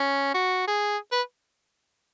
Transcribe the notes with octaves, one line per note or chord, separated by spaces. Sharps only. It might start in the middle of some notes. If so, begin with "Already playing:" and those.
Already playing: C#4
F#4
G#4
B4